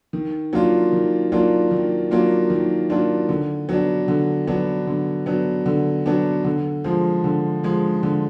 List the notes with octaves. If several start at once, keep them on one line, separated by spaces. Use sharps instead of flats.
D#3
F#3 A#3 D4 F4
D#3
F#3 A#3 D4 F4
D#3
F#3 A#3 D4 F4
D#3
F#3 A#3 D4 F4
D3
F#3 B3 D4
D3
F#3 B3 D4
D3
F#3 B3 D4
D3
F#3 B3 D4
D3
F3 G#3
D3
F3 G#3
D3